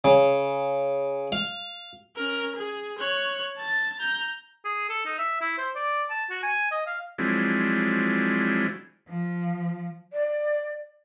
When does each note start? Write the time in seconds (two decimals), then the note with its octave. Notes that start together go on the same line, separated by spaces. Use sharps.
0.04 C#3
1.32 F5
2.17 C#4 A#4
2.56 G#4
2.99 C#5 F#6
3.57 A5 A6
3.99 A#5 G6
4.65 G#4
4.89 A4
5.06 D#4
5.18 E5
5.41 E4
5.58 C5
5.75 D5
6.10 A5
6.31 F#4
6.43 G#5
6.72 D#5
6.87 F5
7.18 F3 F#3 G#3 C4 D4 E4
9.08 F3
10.13 D5